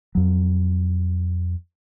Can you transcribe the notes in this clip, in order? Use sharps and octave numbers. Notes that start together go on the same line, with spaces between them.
F2 F#3